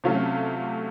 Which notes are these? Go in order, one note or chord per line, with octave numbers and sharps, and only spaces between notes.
C3 F#3 A3 C#4 F4